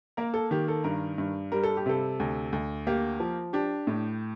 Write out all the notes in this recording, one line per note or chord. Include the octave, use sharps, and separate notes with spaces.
A#3 A#4
A4
D#3 G4
A4
G2 A#4
G2
G3 A#4
A4
G4
C3 A4
D2
D2
A#3 G4
F3
D4 G4
A2